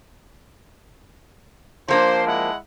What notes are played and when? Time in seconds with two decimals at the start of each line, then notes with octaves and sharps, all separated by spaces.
1.88 F3 A#3 D4 C5
2.27 G#3 E4 F#5